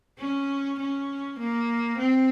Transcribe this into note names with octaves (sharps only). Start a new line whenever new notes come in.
C#4
C#4
A#3
C4